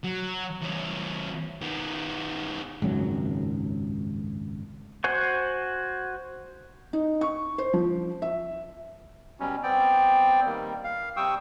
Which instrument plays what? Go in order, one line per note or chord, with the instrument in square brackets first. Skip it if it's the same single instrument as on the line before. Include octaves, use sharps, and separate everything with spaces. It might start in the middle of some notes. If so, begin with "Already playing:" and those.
[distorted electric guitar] F#3
E2 C#4
D#3 B3
[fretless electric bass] G#1 C#2 F#2 F#3
[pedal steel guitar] F#4 C5 F#5 G#5 C#6
[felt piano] D#4
C#6
C5
F3
E5
[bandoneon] B2 F#3 G3 C#4
B3 C4 D5 G5
D#3 G3 A#3
F5
C3 G3 G5 C#6 D#6 E6